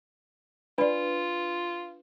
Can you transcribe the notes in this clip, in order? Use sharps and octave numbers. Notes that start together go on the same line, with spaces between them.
D4 F4 B4 D5 B5